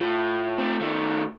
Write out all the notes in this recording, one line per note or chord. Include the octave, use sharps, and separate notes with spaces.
A2 F4
A3 C4
D#3 A3